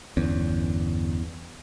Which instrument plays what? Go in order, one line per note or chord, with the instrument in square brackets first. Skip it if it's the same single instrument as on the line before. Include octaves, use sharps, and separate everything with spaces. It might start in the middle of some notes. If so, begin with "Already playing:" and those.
[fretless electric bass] G1 C#4 [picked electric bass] E2